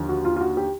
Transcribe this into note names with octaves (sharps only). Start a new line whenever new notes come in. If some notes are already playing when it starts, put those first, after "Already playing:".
Already playing: D#2 D3 F3
F#4
F4
F4
F#4
G4